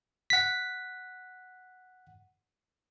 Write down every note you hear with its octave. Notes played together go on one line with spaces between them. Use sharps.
F#5 B6